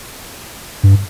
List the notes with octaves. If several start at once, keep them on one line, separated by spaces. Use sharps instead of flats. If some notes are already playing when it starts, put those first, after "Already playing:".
G2